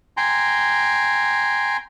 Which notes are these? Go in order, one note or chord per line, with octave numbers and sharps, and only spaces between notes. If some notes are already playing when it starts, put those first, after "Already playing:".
G5 G#5 A#5 C6